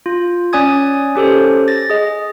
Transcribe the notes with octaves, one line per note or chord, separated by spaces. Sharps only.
F4
C#4 D5 G#5 D#6 G#6
C#4 G4 A4 C5
A6 A#6
G#4 D#5